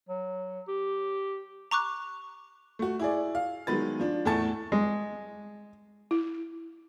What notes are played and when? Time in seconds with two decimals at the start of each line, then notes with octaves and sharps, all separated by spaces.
0.09 F#3
0.68 G4
1.71 A#5 C#6 D6 F#6
2.79 A3 F#4
2.99 E4 G#4 D5
3.35 F5
3.67 D#3 F#3 G#3 B3 B4 A6
4.00 F3 D4
4.25 E2 A2 A3 G#5 A5 A6
4.72 G#3
6.11 E4